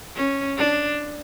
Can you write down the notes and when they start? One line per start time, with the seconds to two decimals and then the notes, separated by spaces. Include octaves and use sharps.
0.15 C#4
0.57 D4